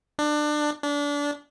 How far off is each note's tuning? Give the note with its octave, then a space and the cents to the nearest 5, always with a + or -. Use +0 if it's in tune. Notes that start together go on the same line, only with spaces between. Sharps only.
D4 +25
D4 -25